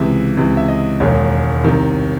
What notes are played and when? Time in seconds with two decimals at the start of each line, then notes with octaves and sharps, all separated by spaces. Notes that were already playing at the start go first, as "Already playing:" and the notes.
Already playing: C#2 C3 E3 E5
0.37 C#2 C3 E3
0.57 E5
0.68 D#5
1.00 E1 D#2 D#3 C#5
1.64 C2 C3 D#3